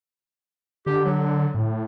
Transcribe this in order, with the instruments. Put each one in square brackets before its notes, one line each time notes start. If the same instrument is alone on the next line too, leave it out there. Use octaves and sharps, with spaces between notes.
[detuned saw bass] D3 [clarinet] G4
[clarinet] F#3
[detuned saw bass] A2